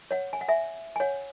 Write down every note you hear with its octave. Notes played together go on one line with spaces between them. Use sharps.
C#5 F#5
G#5
F#5
E5 G#5
G#5
C#5 F#5